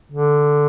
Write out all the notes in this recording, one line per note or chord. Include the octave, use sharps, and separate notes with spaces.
D3